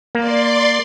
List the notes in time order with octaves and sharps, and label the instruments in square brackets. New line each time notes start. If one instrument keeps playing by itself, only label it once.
[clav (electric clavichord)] A#3 [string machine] D5 C6